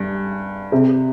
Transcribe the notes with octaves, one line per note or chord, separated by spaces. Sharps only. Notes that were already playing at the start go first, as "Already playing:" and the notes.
Already playing: G2
C3